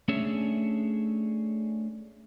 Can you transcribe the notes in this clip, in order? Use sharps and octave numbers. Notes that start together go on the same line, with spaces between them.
A3 C#4 D4 G#4 C#5 E5